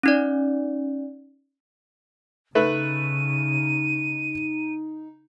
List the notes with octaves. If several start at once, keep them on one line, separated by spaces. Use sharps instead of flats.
C#4 D#4 D5
C#3 A3 D#4 B4 E5 D#7